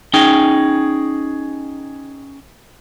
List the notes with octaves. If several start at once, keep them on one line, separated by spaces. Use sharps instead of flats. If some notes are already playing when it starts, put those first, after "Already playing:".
C#4 D#4 G#4 G5